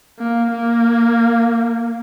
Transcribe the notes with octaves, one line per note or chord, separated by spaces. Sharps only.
A#3
A#3